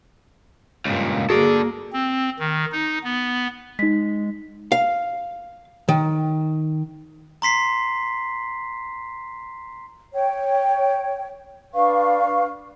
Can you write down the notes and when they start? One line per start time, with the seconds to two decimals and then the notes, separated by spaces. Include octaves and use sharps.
0.85 C#2 G2 A#2
1.30 A#3 F#4 G#4 A4 D5
1.93 C4
2.39 D#3
2.72 D#4
3.04 B3
3.79 G#3 D#4 B6
4.72 F5
5.89 D#3
7.42 A#5 C6 B6 C7
10.13 C#5 G5
11.74 D4 B4 F5 C#6